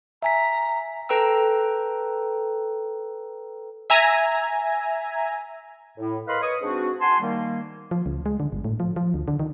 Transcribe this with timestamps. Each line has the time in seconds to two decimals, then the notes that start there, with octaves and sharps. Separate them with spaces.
0.23 E5 G#5 A#5 B6
1.09 A4 B4 G5 A#5 E6
3.90 E5 G#5 A#5
5.97 A2
6.27 A#4 B4 D#5 F5 B5 C6
6.41 B4 C#5 D#5 C#6 D#6
6.61 G#2 C4 D4 F#4
7.00 F#5 G#5 A5 C6
7.20 D#3 G3 A#3
7.91 F3
8.06 C#2
8.26 G#3
8.40 D3
8.52 G1
8.64 A2
8.80 F3
8.96 F3
9.14 D2
9.28 D3
9.39 D#3